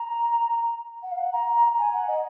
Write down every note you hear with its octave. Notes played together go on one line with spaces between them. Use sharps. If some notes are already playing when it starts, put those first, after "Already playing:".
Already playing: A#5
F#5
F5
F#5
A#5
G#5
F#5
D#5